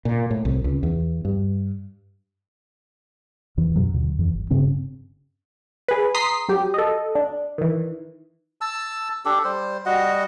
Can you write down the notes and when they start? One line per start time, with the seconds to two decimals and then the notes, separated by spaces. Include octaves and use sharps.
0.05 A#2
0.31 A2
0.45 C2
0.64 C#2
0.83 E2
1.25 G2
3.57 E2 E3
3.76 F#2 B2 F#3
3.94 D#2 D3
4.19 F2 E3 F3
4.34 G1
4.50 G2 C#3 C4 C#4
5.88 G#4 B4
6.15 A#5 C6 D#6 B6 C7
6.49 F#3 G4
6.74 A4 D#5
7.15 D4
7.58 D#3 E3
8.61 A5 E6
9.25 D4 G4 A4
9.44 G3 C5
9.86 G3 F#4 D#5 F#5